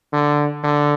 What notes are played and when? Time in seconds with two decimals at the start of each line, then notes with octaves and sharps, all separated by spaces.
0.13 D3
0.64 D3